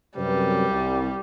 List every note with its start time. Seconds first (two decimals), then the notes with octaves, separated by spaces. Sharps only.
0.17 F#2 C3 G3 B4
0.70 C2